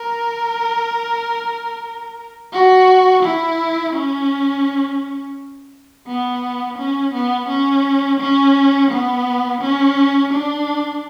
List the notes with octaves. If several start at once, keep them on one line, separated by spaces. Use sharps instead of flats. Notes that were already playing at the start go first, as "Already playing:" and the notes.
Already playing: A#4
F#4
E4
C#4
B3
C#4
B3
C#4
C#4
B3
C#4
D4